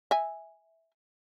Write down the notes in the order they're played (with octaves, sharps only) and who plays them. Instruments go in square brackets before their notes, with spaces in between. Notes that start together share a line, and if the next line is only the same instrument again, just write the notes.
[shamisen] E5 G#5